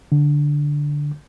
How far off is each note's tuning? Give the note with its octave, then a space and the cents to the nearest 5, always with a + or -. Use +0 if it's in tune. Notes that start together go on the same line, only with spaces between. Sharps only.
D3 -5